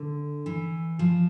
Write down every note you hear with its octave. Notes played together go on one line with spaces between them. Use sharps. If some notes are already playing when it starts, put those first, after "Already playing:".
Already playing: D3
E3
F3